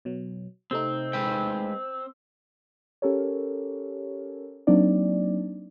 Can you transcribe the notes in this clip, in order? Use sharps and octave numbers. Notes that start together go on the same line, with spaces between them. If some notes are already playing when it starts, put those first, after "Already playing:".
B2 F#3
C3 A3 C4 D#4
G#3 B4 G5
C#4 G4 A4 A#4 C#5
F#3 A#3 C4 D4 D#4 D5